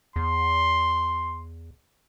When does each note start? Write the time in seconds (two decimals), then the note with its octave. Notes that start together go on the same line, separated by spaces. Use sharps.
0.16 E2 C6